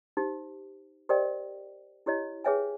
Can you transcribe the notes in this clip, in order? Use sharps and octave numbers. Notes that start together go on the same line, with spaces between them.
D#4 G4 C5
G4 A#4 C5 D5 D#5 G5
E4 G4 C#5 D#5
G#4 B4 C#5 E5 G5 G#5